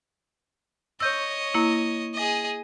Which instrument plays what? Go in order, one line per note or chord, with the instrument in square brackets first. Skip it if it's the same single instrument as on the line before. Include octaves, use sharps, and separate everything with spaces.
[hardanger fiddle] C#5 D#5 [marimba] E6 G6
[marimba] A#3 E4
[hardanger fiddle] G#4 D#5